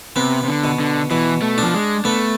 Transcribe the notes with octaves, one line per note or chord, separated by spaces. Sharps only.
C3 B3
C3
D3
B2
D3
B2 E3
A3
F3 D4
G#3
A3 B3